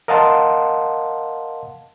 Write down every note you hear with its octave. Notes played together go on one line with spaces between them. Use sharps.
A#4 D#5 F5 F#5 A5 C6